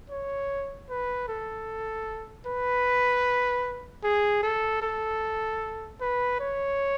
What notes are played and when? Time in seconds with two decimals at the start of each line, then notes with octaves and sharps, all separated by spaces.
0.10 C#5
0.89 B4
1.28 A4
2.46 B4
4.04 G#4
4.43 A4
4.82 A4
6.01 B4
6.40 C#5